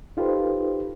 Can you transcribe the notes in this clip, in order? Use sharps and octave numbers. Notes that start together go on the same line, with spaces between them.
D#4 F4 G4 A4 B4 C5